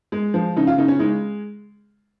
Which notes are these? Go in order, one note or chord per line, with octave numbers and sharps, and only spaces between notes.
G#3
F3
C#3 D#4
F4
C#3 D#4
C#4
G#3 D#4